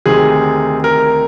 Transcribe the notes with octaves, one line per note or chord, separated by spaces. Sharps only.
D2 C3 D#3 G#4
A#4